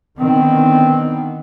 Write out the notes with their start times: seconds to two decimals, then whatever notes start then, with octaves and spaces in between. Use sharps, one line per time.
0.19 D3 D#3 B3 C4